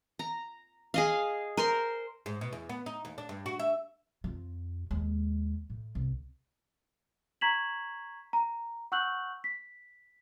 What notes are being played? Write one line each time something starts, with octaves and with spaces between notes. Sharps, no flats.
A#5
G#4 D#5 F5
A#4 C5 C6
G#2
B2
E2
B3
D#4
D#2
D4
G2
F#4
E5
F2 F4
D#2 G#3
A2
C2
A#5 C#6 G#6 B6 E7 F#7
A#5
F#5 C#6 E6 F#6 G6 F#7
B6